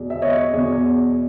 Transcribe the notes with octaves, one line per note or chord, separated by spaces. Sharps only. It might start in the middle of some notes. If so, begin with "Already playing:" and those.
Already playing: E2 B2
E5
C#5 D#5
E2 B2